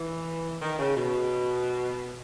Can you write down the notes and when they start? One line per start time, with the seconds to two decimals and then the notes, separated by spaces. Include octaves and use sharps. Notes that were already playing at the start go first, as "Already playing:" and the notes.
Already playing: E3
0.62 D#3
0.79 C#3
0.96 B2